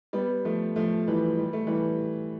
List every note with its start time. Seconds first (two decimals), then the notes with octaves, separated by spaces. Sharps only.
0.13 G3 B3
0.45 F3 A3
0.76 F3 A3
1.08 E3 G3
1.39 G3
1.53 A3
1.67 E3 G3